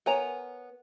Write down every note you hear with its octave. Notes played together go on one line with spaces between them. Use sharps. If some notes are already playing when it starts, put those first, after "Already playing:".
B3 A#4 C#5 G#5 A#5